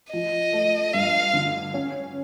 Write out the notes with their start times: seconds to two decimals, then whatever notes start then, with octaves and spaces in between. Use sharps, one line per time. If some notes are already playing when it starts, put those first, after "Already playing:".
0.13 F3 D#5
0.53 A3
0.94 G2 F5
1.34 D3
1.74 C#4